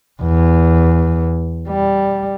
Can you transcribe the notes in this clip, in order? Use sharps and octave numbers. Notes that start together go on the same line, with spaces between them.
E2
G3